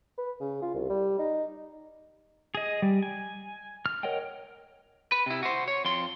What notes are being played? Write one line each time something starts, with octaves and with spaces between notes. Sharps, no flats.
B4
C#3
F4
C2
G3
D#4
G#4 D#5
G3
G#5
F6
A#4 C#5 D#5 F#5 G5
B4
C3 E4
F#4 C5
C#5
F2 C6